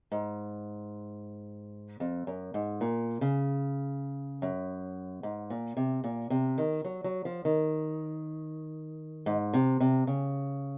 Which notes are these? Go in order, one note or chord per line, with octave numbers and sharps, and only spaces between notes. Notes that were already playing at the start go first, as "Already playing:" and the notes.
G#2
F2
F#2
G#2
A#2
C#3
F#2
G#2
A#2
C3
A#2
C3
D#3
F#3
F#3
F3
D#3
G#2
C3
C3
C#3